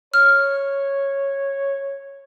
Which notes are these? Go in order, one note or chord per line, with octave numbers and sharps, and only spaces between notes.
C#5 F6